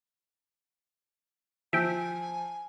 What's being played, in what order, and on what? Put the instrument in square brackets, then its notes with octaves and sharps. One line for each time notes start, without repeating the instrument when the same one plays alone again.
[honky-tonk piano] F3 [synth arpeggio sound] E5 G5 [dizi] G#5